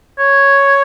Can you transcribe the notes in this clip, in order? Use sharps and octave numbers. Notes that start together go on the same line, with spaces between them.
C#5